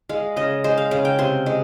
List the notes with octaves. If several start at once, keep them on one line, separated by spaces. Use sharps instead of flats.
G#3 F5
C#3 D#5
G#3 C5
F5
C#3 F5
G5
C3 C6
G#3